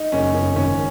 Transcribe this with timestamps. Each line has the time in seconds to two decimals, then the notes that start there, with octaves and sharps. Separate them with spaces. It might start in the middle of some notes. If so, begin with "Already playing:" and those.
Already playing: D#4
0.12 F#1 C#4
0.34 F#2
0.56 G#1 C#4